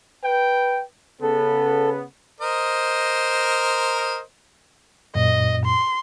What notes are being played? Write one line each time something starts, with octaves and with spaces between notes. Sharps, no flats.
B4 G5
C#3 B3 A4
A#4 C5 D#5
F#2 A#2 D#5
C6